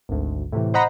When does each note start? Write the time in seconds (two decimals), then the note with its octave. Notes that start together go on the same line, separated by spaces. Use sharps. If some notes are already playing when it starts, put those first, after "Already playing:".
0.09 G#1 D2
0.52 A2 C3 E3
0.74 C5 D#5 F#5 A#5 B5